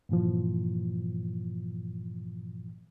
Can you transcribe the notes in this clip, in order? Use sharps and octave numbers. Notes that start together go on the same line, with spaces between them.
G2 A#2 E3 F3